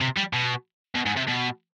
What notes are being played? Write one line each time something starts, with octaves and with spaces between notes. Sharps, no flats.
C3
G3
B2
B2
G#2
C3
B2